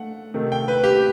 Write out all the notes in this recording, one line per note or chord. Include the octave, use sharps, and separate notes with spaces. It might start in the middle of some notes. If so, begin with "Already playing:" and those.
Already playing: A3 F#5
C3 D#3 A3
G5
B4
G4